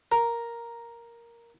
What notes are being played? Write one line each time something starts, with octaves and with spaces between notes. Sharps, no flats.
A#4